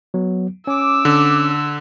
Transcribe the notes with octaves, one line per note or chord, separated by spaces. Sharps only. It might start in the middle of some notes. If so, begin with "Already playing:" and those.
F#3 B3
C#4 D6 E6
D3